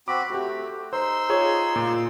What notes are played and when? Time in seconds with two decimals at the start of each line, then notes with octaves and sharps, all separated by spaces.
0.08 C4 F#4 B5 D6
0.30 A3 F#4 G4
0.93 D#4 C5 C6 E6
1.29 F4 G#4 C#5
1.76 A#2